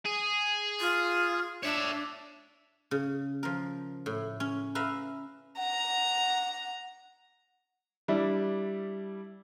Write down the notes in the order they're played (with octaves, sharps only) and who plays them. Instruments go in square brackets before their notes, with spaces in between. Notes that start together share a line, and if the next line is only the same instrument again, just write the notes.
[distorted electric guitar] G#4
[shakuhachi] F4
[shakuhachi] D4 [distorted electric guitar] C#5 E5
[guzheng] C#3
F3 A#4
A2
C#4
B4 E5 F5 A#5
[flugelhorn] F#5 [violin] A#5
[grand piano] G3 D4 E4